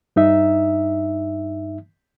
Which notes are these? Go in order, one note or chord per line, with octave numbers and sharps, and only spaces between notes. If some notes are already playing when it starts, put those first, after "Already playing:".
G2 D#4 E5